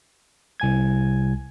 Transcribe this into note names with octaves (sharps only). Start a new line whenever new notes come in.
C2 G#5 G#6